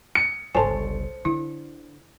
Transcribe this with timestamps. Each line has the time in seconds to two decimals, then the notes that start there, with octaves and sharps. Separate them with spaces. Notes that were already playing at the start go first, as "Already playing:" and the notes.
0.15 C#7
0.55 G1 C#2 A4 C5 C#5 G#5 A5
1.25 D3 E4